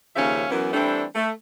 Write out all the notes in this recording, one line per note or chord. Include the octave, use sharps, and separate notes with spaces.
D#2 C#3 F3 C#4 E5 F5
F#2 E3 B3
E3 G3 A3 C4 D4
A3